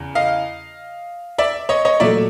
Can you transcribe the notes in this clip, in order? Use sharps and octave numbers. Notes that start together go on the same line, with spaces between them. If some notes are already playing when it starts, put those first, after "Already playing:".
Already playing: E2 C#3
D#5 F5
D5 E5
C#5 D#5
C#5 D#5
A#2 F#3 A3 D5 E5